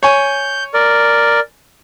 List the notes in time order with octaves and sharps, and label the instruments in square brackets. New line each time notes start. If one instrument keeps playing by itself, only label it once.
[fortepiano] C#5 G#5 [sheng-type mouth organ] G6
[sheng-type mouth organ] A#4 D5